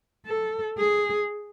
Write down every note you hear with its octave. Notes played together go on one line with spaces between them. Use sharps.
A4
G#4